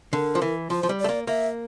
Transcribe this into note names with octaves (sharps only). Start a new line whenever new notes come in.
D3 A#4
F3
E3
F3 C5
F3
G3
D5
A3
A#3
A#3 E5